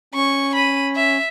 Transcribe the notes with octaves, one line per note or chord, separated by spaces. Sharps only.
C#4 C#6
B5 D#7
E5